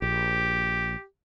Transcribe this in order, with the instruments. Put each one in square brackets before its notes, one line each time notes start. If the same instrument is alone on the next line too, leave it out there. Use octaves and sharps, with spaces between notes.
[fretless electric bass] A#1 [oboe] G4